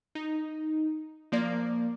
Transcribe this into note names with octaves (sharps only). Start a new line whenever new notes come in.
D#4
F3 A#3 D5